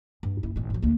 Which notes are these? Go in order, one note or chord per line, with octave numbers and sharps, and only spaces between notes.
G2
F#1 E4
G#1 A2
G#2 F#3
D2 A#3